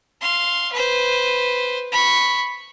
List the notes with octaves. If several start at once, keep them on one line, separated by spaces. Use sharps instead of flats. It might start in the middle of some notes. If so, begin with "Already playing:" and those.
F5 C6
B4 C5
B5 C#6